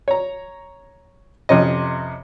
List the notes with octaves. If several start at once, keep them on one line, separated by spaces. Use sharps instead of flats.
C#5 A#5
F2 C3 C#4 D#5